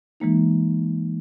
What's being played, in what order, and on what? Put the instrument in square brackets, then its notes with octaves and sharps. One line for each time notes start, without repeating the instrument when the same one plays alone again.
[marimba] E3 G#3 A#3 D#4